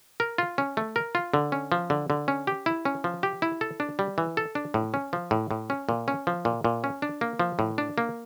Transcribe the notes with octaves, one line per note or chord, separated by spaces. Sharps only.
A#4
F4
C#4
A3
A#4
F4
D3
C#4
F3
D3
D3
C#4
G4
E4
C#4
F3
G4
E4
A4
D4
G3
E3
A4
D4
A2
C#4
F3
A2
A2
C#4
A#2
C#4
F3
A#2
A#2
C#4
D4
A#3
F3
A2
D4
A#3